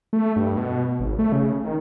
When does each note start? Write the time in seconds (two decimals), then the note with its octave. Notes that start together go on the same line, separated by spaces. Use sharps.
0.13 A3
0.36 G2
0.57 B2
1.00 G#1
1.19 A3
1.32 C#3
1.64 D#3